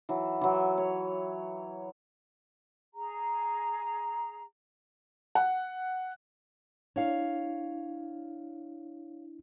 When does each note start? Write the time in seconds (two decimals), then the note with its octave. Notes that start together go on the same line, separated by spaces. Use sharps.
0.09 E3 F#3
0.41 E3 F#3
0.78 C#5
2.94 G#4 A#5
5.35 F#5
6.96 D4 E4 C#5 F5